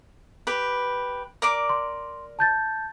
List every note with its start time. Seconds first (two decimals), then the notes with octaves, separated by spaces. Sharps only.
0.47 G4 B4
1.42 A#4 D5 D6
1.69 C6
2.39 A5 G6 A6